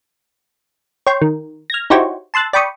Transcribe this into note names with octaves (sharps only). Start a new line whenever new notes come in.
C#5 G5 C6
D#3
F6 G#6 A#6
D#4 E4 F#4 G4 C5 C#5
A5 C6 E6 F#6 A6
D5 G5 B5 C#6 D#6